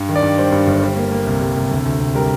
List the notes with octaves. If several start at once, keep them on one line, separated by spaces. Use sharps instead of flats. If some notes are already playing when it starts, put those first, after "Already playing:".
Already playing: G2
D#3
D5
G2
G3 C5
G2
G1
G3
A#3
A#3
C2
G3
C2
D2
D2
C3
G3 A#4